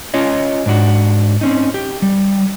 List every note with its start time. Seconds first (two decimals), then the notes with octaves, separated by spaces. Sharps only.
0.14 C#4 F4 C#5 D#5
0.66 G#2 D4 F#4
1.41 C4 C#4 D#4
1.74 G4
2.02 G3